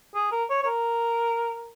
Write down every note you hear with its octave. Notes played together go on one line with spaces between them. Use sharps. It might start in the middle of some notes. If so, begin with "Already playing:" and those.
G#4
A#4
C#5
C#5
A#4